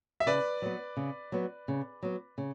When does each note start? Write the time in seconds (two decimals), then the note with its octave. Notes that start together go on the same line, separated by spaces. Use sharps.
0.20 E5
0.26 C#3 B4 D5
0.62 F#3 B3
0.97 C#3
1.32 F#3 B3
1.68 C#3
2.03 F#3 B3
2.38 C#3